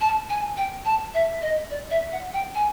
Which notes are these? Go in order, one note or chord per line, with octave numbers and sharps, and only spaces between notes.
A5
G#5
G5
A5
E5
D#5
D5
E5
F#5
G5
G#5